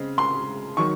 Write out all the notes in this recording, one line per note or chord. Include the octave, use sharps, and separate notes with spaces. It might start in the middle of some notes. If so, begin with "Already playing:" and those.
Already playing: C#3 G#3 C4
C6
D#3 F#3 C#6